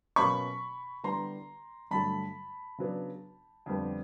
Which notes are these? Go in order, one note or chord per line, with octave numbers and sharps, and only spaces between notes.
B2 F#3 A#3 C#4 B5 C#6
D3 G3 B3 E4 A#5 C6
G2 D3 F#3 A3 A5 B5
C#3 F#3 B3 D4
F2 D3 G3 B3